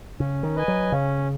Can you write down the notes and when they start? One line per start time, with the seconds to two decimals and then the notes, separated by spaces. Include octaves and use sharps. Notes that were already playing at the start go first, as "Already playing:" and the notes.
0.19 C#3 C#4
0.43 D#3
0.56 B4 D#5 G#5
0.68 F#3
0.92 C#3 C#4